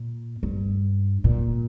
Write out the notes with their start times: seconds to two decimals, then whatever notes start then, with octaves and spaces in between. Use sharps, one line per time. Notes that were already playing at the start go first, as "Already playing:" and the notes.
Already playing: A#2
0.43 G2
1.24 A#2